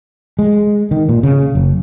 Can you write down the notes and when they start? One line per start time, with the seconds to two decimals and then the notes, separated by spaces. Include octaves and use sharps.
0.39 G#3
0.91 D#3
1.09 A#2
1.23 C#3
1.55 F#1